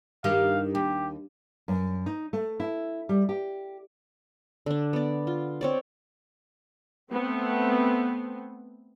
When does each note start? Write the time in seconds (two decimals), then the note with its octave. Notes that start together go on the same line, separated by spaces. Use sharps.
0.24 G2 D#3 G4 F5
0.75 D#2 G4
1.68 F#2
2.06 D#4
2.33 A3
2.60 E4
3.09 G3
3.29 G4
4.66 D3 D4
4.93 B3 D5
5.27 F4
5.61 C4 C#5 D5
7.10 A3 B3 C4